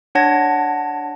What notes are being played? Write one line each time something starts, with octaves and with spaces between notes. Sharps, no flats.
D4 C#5 F#5 A5 G#6 A#6